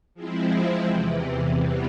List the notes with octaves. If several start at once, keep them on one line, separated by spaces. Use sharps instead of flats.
F3 G#3 C4 E4
E2 C3 E3
C3 E3 G3 B3